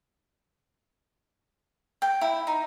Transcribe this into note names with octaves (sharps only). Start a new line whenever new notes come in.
G5
E4
D#4